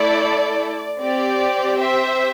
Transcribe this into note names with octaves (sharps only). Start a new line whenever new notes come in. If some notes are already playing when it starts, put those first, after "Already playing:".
Already playing: A3 E4 A4 D5
C4 G4 D5
C5 E5